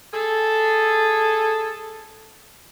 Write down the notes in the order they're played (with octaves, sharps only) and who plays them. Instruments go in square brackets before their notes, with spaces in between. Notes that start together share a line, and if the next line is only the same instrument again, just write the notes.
[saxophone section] G#4 A4